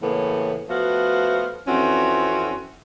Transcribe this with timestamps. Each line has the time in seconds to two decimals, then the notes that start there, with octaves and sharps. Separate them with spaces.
0.01 A2 C#3 E3 A#3 B3
0.69 F3 A3 B3 F#4 F5
1.67 F2 E3 C4 C#4 F#4